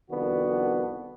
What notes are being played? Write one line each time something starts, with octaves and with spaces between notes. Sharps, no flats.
C2 F2 D#3 B3 D4 F#4